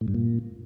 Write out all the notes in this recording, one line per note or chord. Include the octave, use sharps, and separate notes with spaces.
A2
G2
A#2